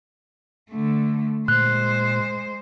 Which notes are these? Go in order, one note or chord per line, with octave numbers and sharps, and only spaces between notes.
D3 A3
A#2 G#3 C5 F#6